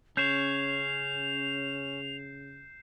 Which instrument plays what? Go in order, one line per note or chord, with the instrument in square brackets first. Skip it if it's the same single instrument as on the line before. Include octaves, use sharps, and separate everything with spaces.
[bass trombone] C#3 [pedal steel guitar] C#4 C#5 [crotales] G6 C7 E7 [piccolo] F7